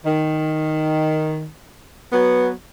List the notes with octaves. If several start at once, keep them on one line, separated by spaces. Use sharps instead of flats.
D#3
F#3 B3